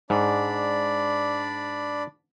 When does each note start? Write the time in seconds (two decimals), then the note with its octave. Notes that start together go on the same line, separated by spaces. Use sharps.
0.10 G#2 D4 D5 B5